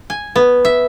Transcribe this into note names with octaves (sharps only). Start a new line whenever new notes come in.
G#5
B3
E5